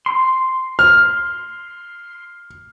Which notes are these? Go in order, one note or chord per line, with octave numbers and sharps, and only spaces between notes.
C6
F6